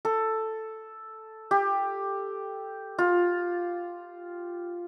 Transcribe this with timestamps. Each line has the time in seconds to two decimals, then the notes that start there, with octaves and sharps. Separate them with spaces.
0.05 A4
1.51 G4
2.98 F4